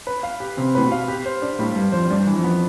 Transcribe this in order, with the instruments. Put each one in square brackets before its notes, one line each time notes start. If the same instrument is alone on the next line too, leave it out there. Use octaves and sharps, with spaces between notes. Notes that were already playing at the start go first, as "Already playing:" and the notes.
[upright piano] B4
F5
G4
[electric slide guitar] C3 [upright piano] C4
[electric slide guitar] A2 [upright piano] B4
[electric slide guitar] B2
[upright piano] F5
G4
C5
D4
[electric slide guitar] A2 [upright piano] G3
[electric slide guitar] G2 [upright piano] G4
[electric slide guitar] F2 [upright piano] C5
[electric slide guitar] G2 [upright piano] D4
[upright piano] E3
[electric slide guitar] F2
[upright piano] B3